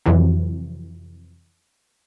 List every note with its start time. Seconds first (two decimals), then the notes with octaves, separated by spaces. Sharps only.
0.06 F2 C3 E3 F#3